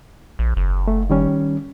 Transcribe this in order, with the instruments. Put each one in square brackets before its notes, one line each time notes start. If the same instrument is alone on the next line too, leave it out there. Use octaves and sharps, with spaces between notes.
[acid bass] A#1
F#1
[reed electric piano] A3
D#3 G3 C#4